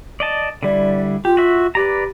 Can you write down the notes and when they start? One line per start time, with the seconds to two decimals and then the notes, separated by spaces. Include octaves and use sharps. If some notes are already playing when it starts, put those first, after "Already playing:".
0.20 D5 D#5 A5
0.63 D3 G3 E4 D5
1.25 F4 G4
1.37 F#4 E5
1.75 G4 B4 D5 A#5